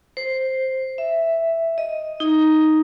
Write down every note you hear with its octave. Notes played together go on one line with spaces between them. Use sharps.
C5
E5
D#5
D#4